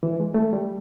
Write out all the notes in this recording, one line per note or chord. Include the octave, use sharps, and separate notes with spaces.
E3
G#3
A3
G3